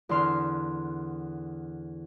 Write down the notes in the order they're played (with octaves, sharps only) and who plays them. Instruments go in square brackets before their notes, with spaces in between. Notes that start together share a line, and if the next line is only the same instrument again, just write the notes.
[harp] E2 D3 C6 F6